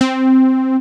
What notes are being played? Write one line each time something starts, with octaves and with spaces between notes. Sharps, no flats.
C4